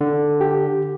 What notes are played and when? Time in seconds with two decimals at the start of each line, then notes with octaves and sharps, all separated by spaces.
0.01 D3
0.41 G4